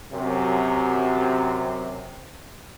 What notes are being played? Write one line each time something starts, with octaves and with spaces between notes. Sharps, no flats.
F#2 C3